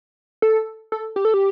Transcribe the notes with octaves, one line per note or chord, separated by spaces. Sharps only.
A4
A4
G4
A4
G4